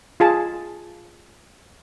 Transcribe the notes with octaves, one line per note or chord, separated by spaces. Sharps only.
F4 G#4 A5